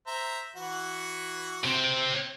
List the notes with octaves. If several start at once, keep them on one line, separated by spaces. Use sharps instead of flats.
C5 E5 A#5
E3 F#4 F#5
C3 C4